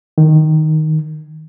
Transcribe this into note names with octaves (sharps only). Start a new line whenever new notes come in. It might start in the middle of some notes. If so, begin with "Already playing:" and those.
D#3